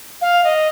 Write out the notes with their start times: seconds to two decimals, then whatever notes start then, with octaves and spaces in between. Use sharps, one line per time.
0.21 F5
0.44 D#5